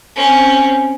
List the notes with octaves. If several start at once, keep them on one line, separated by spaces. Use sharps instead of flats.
C4 C#4